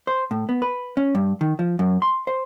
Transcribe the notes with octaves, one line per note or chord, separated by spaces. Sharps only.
C5
A2
B3
B4
C#4
G2
D#3
F3
F#2
C6
C5